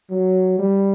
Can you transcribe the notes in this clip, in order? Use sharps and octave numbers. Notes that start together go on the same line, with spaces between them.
F#3
G3